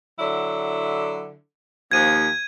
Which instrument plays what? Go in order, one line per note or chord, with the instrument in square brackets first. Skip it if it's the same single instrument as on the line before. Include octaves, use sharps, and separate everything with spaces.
[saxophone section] D3 F#3 E4
[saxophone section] D#2 F3 [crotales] G#6 D#7